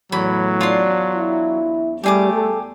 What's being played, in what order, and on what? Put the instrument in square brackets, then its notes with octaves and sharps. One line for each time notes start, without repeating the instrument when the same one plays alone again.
[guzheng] E2 [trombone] A2 [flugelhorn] F#3 [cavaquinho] B5
[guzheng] D4 [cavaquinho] F4 C6
[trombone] E4
[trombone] G3 [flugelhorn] A3 [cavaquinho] G4 G#4 D6
[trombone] A4